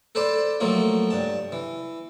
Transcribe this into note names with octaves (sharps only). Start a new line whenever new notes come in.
A4 B4 C5 D5 A5
F3 F#3 A3 A#3 F4
G2 A5
E3